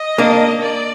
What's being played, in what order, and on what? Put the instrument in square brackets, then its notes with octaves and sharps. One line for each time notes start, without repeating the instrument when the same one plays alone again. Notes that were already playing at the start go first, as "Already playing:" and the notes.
Already playing: [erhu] D#5
[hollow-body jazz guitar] A#3 D4
[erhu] D5